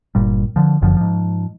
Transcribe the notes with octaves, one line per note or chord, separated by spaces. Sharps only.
G1 A#2 G3
D3 F3
F#1 F#2 D3 F3
G#2 F3